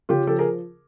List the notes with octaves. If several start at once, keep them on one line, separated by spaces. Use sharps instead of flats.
C#3 F4 G4
F3 G4 A4
G#4 A#4